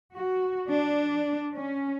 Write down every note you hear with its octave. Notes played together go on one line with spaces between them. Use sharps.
F#4
D4
C#4